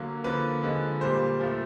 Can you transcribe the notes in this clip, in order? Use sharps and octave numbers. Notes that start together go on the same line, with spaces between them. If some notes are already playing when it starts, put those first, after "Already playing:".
Already playing: D3 F#3 A#3
D3 F3 A#3 B4
D3 F3 G#3
A#2 G3 A#3 C5
A#2 F3 A3